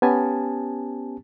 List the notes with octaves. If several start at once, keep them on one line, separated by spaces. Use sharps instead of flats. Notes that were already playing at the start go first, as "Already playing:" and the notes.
B3 C#4 G4 G#5 A5